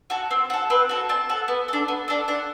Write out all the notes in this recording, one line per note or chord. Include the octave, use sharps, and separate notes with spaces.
F#4 A4
C4
F#4 A4
C4 B4
F#4 A4
C4 A5
F#4 A4
B3
D4 A4
B3
D4 A4
D4 F#5